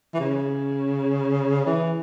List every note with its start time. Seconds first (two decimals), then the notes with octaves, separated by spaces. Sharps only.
0.14 E3
0.20 C#3
1.66 E3